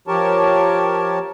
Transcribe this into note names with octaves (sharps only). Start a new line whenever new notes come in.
F3 G4 A#4 C#5 A5